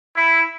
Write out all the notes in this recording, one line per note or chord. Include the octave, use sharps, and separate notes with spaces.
E4